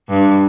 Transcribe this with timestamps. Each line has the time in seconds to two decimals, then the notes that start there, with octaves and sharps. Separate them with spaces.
0.09 G2